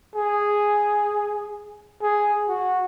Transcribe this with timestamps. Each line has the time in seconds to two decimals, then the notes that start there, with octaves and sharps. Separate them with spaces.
0.15 G#4
2.02 G#4
2.49 F#4